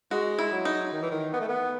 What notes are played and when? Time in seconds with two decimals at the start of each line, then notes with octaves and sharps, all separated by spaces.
0.11 G#3 F#4
0.39 E4
0.52 F#3
0.65 D#4
0.92 D#3
1.02 E3
1.11 D#3
1.33 B3
1.41 A3
1.48 B3